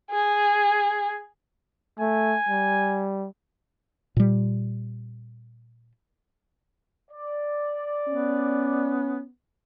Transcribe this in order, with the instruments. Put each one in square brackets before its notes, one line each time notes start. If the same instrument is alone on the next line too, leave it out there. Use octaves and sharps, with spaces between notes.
[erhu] G#4
[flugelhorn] A3 [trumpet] G#5
[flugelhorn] G3
[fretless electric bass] A#2 G3
[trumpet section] D5
[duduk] B3 [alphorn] C#4